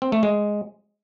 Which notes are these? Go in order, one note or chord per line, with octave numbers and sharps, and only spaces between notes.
C4
A3
G#3